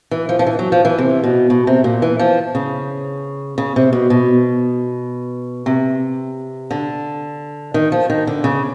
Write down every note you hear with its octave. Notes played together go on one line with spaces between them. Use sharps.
E3
F3
F3
E3
F#3
F3
E3
C3
B2
B2
C3
A#2
E3
F3
C#3
C#3
C3
B2
B2
C3
D3
D#3
F3
D#3
D3
C#3